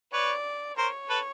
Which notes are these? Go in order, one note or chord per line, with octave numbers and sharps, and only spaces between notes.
B4 C#5 D5
A#4 C5 C#5
A4 B4